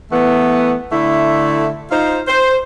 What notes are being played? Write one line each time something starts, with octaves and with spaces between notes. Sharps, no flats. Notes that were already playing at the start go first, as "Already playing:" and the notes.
E3 A3 B3
D3 A3 E4
D#4 F4 C5
C5